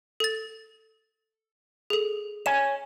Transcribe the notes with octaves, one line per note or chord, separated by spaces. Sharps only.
A4 A6
G#4 A4
C#5 G#5 E7